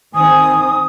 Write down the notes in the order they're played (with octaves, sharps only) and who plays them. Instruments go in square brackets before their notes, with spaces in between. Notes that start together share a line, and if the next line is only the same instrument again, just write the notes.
[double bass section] D#3 C4 [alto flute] G#5 [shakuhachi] D#6